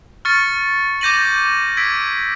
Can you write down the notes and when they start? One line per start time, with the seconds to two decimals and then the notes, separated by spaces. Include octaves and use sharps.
0.25 C#6 F6 A6 C#7
1.01 D6 G6 A#6 D#7 F#7
1.77 E6 G#6 B6 D7